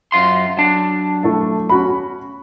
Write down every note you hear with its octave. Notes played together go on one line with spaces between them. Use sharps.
F#2 F4 C6
F#3 D4
A3 E4 A5
C#4 F#4 B5